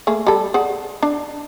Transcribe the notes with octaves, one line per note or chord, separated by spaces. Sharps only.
A3 A#3 G#4
G3 A4
G#4 D5 F#5
D4